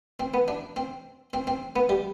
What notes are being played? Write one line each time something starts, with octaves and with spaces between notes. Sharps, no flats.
C4
B3
D4
C4
C4
C4
B3
G3